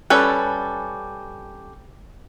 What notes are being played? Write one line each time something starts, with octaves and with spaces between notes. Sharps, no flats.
G3 C#4 A4 B4